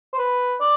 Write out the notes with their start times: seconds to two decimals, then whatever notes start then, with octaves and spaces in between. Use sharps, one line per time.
0.13 C5
0.18 B4
0.60 D5